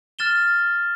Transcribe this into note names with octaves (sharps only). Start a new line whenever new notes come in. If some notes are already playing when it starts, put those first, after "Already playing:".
F6 A6 E7 G7